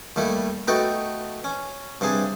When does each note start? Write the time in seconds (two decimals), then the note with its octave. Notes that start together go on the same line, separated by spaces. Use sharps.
0.16 D#2 G3 A3 E4
0.68 A3 B3 D#4 F#4 A4 G5
1.44 C#4
2.01 G2 C3 D4 G#4